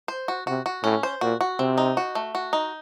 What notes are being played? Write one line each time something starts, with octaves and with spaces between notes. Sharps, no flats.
C5
F#4
C3 F#4
F#4
A2 C#4
C5
A#2 F#4
F#4
C3 C4
D#4
F#4
A3
F#4
D#4